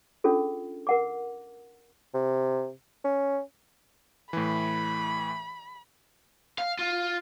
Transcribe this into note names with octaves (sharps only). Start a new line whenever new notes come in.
C#4 D4 F4 G#4 A4
A#4 F#5 D6
C3
C#4
A2 E3 B5
F5
F4